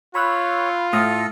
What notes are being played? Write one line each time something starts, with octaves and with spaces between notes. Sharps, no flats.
F4 C#5 B5 E6 F#6
A2 A4 D#6 F6 A#6